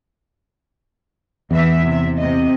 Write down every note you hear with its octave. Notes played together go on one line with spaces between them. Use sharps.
E2 E3 E5
C3 E5
C3 D#5